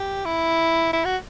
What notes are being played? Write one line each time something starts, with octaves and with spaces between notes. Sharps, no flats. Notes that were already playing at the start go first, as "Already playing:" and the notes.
Already playing: G4
E4
E4
F#4